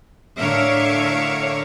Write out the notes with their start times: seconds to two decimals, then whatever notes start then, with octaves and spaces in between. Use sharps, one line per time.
0.37 A2 D3 A#4 C#5 E5 F5